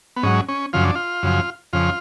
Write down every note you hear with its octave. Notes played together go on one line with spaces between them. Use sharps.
B3
G#2 F#3 C#4
C#4
F#2 C#3 F3 F4
D4
F4
F#2 C#3 F3
F2 C#3 F3 F4